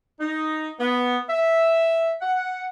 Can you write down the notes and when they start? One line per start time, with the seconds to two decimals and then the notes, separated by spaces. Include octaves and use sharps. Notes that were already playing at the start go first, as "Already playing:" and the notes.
0.20 D#4
0.80 B3
1.30 E5
2.22 F#5